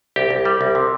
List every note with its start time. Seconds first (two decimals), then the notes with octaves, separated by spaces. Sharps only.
0.16 C2 G4
0.31 C2
0.45 G3
0.61 C2
0.75 C3